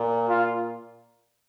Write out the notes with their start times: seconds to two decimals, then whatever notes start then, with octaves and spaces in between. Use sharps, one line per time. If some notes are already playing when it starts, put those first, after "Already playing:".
Already playing: A#2
0.29 F4